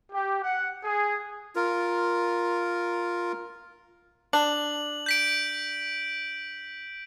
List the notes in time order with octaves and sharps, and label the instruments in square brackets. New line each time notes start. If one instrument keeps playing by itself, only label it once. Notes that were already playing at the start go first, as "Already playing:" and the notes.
[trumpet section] G4
F#5
G#4
[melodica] F4 A#4
[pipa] D4 [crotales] F#7
[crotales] G6 B6 D7